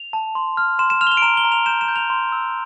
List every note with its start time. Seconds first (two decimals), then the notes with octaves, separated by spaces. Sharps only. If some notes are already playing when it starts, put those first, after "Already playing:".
Already playing: F7
0.13 A5
0.35 C6
0.57 F6
0.79 C6 E7
0.90 E7
1.01 F6 F7
1.07 G7
1.11 F7
1.17 D7
1.22 A#5 E7
1.37 G7
1.45 A#5
1.52 F7
1.66 G6 E7
1.81 E7
1.88 G6
1.96 F7
2.10 C6
2.32 E6